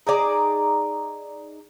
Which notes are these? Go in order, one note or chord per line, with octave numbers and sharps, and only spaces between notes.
D#4 G#4 D5 A#5